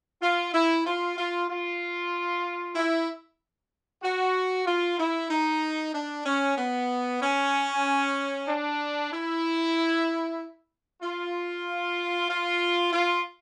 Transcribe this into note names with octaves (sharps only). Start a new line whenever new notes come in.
F4
E4
F4
F4
F4
E4
F#4
F4
E4
D#4
D4
C#4
B3
C#4
D4
E4
F4
F4
F4